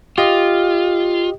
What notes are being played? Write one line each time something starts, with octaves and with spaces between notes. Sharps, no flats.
F4 G4 D#5